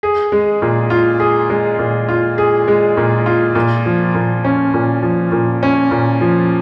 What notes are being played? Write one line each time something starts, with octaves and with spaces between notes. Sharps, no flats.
G#4
G#3
A#2
F4
G#4
G#3
A#2
F4
G#4
G#3
A#2
F4
A#2
F3
A#2
C#4
A#2
F3
A#2
C#4
A#2
F3